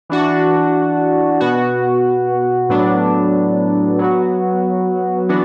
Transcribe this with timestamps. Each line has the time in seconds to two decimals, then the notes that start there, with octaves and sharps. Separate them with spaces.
0.09 E3 D4 F#4
1.40 B2 B3 F#4
2.69 A2 F#3 B3 D4
3.99 F#3 B3 F#4
5.29 E3 B3 D4 F#4